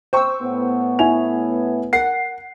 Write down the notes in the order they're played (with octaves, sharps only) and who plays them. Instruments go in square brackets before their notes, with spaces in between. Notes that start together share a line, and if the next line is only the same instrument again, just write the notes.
[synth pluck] C5 E6 [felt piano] G5 C#6
[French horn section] A2 B3
[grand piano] E4 G#5 F7
[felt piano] A#4 [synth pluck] F#5 [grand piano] C7